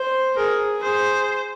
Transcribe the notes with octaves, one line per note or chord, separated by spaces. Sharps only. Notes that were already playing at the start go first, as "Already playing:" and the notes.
Already playing: C5
G#4 A#4
G#4 C5